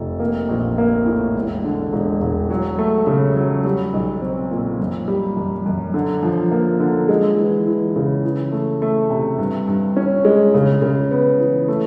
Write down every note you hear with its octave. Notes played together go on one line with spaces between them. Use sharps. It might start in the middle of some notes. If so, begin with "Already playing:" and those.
Already playing: F1
A#3
A#1
A#3
A2
E1
D3
E1
E1
F#3
A3
C#3
F#3
G3
B1
C4
A#2
F#2
G3
F#2
F#2
D3
F3
A#3
D3
G#3
E3
E3
C#3
E3
A3
A3
C3
G2
G2
C#4
G#3
C#3
C#3
B3
E3
A3